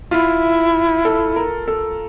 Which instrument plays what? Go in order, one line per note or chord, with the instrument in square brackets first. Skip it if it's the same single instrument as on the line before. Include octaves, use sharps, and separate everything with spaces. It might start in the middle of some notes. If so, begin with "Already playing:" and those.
[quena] E4 [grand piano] F4
[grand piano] A4
A#4
A4